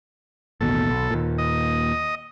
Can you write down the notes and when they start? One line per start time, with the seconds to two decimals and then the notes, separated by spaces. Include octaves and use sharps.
0.61 A1 D#2 B2 A4
0.90 B1
1.11 D#2 A#2
1.38 D#5